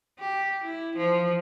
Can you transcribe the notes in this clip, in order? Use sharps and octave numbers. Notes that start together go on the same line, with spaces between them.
G4
E4
F3